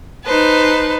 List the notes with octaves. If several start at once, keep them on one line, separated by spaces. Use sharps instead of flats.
D#4 B4 C5 A5